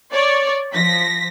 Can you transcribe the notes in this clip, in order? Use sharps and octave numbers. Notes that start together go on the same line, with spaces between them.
C#5 D5
F3 A#6 B6